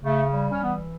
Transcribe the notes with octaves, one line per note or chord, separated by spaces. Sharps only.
C#3 A3
G3
C#4
E3 B3